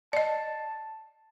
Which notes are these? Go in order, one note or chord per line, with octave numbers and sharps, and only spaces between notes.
D5 D#5 A5